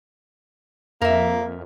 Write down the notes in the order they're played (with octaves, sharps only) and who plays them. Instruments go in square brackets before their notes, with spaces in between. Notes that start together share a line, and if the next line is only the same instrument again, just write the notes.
[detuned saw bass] F2 [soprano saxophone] A#3 [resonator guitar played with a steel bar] A#4 E5